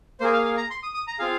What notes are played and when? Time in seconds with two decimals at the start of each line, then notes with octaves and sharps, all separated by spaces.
0.20 A#3 G#4 C5
0.33 F5
0.45 F5
0.57 A#5
0.71 C6
0.83 D#6
0.94 D#6
1.07 A#5
1.19 C4 F4 G#4 F5